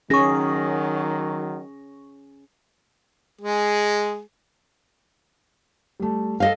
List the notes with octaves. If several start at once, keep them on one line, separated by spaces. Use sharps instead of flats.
D#3 F#3 C#4 G#4 C#6 A#6
G#3 G#4
G3 A3
A4 D#5 F5